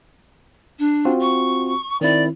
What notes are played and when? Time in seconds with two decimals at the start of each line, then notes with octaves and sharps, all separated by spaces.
0.79 D4
1.05 C4 F4 F#4
1.20 C#6
2.01 D#3 C4 E4 D5